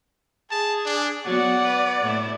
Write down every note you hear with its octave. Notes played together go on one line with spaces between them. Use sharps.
G#4 A5
D4
F#3 B3 D5 F#5
B4
A2 E4